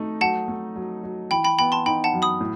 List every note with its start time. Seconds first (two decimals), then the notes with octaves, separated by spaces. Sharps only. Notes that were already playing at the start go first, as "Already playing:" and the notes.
Already playing: A3 D#4
0.21 F#3 F#5 A5
0.48 A3
0.76 F#3
1.03 F#3
1.31 E3 G5 B5
1.44 G5 B5
1.59 B3 G5 B5
1.72 A5 C6
1.86 D#4 G5 B5
2.04 F#5 A5
2.13 F#2
2.22 B5 D#6
2.41 A2